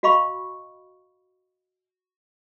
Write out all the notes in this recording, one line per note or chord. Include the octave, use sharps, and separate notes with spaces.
F#4 D#5 F5 B5 C#6